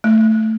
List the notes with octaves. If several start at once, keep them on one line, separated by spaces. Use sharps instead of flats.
A3